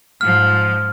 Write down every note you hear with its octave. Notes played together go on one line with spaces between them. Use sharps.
G#2 F3 F6